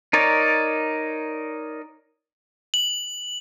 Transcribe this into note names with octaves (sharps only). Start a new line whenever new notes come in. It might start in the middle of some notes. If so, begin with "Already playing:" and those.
D#4 A#4 C#5 D5
F#7